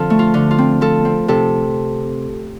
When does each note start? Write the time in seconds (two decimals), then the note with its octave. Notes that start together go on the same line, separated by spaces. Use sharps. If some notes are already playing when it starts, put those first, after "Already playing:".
Already playing: D3 F3 C4 A4
0.10 A3
0.19 F4
0.34 D3
0.51 F4
0.58 C4
0.81 F3 A4
1.05 C4
1.28 C3 A4